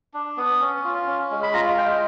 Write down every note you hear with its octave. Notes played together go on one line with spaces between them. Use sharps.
D4
B3
C#4
F4
C#4
G#3
B5
F4 A#5
G#3 G5